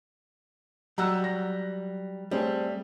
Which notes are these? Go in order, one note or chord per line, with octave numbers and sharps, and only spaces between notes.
F#3 G3 F#5 A#5 E6 F#6
A#6
G3 A3 C4 G#4